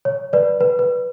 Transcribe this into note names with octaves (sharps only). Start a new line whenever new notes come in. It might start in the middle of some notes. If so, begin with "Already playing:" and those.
C#5
B4 D5
B4
B4